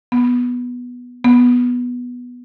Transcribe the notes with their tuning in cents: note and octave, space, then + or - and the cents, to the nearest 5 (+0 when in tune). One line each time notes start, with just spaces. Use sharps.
B3 -5
B3 -5